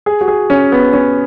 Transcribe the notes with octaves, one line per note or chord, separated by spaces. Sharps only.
G#4
F#4
G#4
C#4
B3
C#4